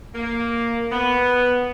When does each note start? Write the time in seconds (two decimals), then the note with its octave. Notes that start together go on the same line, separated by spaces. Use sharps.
0.15 A#3
0.91 B3